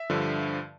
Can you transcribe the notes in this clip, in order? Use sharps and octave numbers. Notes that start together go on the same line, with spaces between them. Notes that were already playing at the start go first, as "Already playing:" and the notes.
Already playing: E5
G2 D3 F3